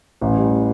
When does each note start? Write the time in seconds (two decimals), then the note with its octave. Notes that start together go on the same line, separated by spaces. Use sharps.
0.21 A1
0.37 G3